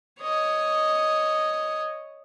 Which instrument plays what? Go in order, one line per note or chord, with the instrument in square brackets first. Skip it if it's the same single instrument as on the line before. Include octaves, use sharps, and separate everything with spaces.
[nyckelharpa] C#5 D#5